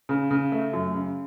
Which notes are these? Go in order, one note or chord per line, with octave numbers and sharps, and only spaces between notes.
C#3
C#3
A3
F#2
C#3